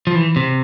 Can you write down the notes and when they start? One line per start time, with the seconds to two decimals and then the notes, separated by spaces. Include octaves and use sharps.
0.07 F3
0.15 E3
0.36 C3